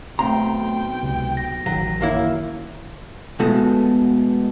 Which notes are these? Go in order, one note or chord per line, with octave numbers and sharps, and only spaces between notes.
B1 A3 C4 G5 A#5 C6
C#2 C3
A#6
A1 D#3 F#3 A#6
F#2 A#3 E4
B2 G#3 A3 B3 F#4 A4